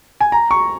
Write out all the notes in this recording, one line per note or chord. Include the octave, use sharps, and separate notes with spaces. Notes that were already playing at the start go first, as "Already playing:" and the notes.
G#5
A#5
C#6